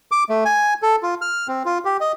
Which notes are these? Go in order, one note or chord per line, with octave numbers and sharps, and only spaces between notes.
D6
A3
G#5
A4
F4
F6
C4
F4
G4
D#5